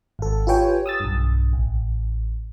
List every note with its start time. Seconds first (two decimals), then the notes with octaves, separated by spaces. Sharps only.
0.19 G#1 A4
0.47 F4 G4 B4 C#5 G5 G#5
0.86 D#6 E6 A6
1.00 B1 G2
1.53 A1